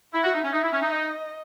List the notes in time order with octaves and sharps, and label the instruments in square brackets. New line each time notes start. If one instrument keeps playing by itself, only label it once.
[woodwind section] E4 [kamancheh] E5
[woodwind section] F#4
D#4
C#4
[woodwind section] D#4 [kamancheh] E5
[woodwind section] E4
C#4
D#4
[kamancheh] D#5